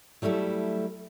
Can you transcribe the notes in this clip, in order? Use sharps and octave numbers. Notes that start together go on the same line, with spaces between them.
F#3 G3 A3 E4 A4